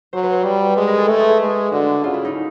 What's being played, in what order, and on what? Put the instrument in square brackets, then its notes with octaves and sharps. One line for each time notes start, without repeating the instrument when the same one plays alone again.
[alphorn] F#3 [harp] C5
[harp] B4
C5
[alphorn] G3
[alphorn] G#3 [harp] B4
[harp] A#4
G#4
A4
[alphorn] A3 [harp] G#4
[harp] G#4
G#4
[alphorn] G#3
[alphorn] D3 [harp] F#4
[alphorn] C#3 [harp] F4
[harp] E4
D#4